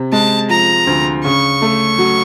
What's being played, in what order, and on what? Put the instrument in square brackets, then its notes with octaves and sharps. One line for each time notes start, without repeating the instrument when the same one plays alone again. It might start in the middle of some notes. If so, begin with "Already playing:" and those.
Already playing: [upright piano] C3
[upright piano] G#3 [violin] A5
[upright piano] F3 [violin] A#5
[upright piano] D2
[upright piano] C#3 [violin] C#6
[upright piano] A3
F#3